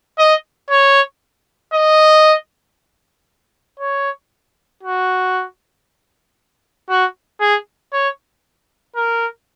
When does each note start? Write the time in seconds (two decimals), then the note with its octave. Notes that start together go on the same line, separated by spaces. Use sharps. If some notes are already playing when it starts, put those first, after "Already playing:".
0.19 D#5
0.70 C#5
1.74 D#5
3.79 C#5
4.83 F#4
6.90 F#4
7.41 G#4
7.93 C#5
8.96 A#4